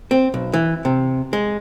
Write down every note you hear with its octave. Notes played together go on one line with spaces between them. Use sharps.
C4
B1
E3
C3
G#3